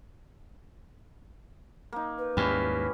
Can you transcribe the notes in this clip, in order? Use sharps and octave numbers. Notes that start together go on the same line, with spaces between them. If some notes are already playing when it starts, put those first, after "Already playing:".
A#3 D#4
B4
D#2 G#2 G3 C#4 E4